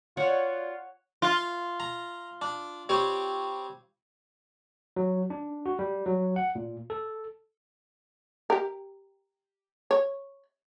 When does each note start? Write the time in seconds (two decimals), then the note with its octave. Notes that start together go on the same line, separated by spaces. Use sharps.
0.17 F4 F#4 C#5 D5 F#5
1.22 F4
1.80 A#5
2.42 D4
2.89 G3 C4 C#5
4.96 F#3
5.30 D4
5.66 F#4
5.79 G3
6.06 F#3
6.36 F#5
6.55 A#2
6.90 A4
8.50 G4 A#4
9.91 C#5